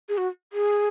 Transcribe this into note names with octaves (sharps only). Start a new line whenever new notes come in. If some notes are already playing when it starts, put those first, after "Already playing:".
G#4
F#4
G#4